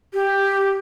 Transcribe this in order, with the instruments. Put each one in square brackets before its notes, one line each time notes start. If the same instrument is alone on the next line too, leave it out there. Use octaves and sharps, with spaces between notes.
[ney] G4